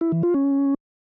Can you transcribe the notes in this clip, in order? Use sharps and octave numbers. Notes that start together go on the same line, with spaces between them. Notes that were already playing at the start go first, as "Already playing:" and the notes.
E4
E3
F4
C#4